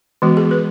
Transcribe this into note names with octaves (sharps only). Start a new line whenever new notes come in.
E3 G#3 B3 F#4
G#4
B4